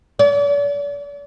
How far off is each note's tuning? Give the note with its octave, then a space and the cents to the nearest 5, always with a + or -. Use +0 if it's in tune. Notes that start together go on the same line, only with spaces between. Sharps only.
D5 -40